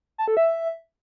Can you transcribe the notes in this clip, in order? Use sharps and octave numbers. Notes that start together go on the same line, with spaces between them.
A5
A4
E5